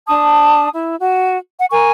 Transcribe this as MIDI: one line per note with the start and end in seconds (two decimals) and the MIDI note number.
0.07 0.68 62
0.07 0.68 81
0.07 0.68 87
0.73 0.95 64
0.99 1.36 66
1.58 1.66 78
1.71 1.92 70
1.71 1.92 80
1.71 1.92 85